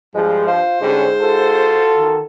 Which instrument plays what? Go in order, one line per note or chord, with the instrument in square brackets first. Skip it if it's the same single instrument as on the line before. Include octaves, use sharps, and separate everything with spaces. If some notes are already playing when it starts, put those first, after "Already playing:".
[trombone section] G2 F3 [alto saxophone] G3 [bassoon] G#3
[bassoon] F4 [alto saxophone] C5
[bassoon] G#2 [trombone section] D3 G3 C#4
[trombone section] F4 F#4 A4
[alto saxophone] D#3